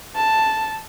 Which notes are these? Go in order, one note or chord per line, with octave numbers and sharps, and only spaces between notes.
A5